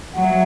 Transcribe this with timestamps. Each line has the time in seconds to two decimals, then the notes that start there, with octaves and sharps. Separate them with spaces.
0.13 F#3 F#5
0.23 E5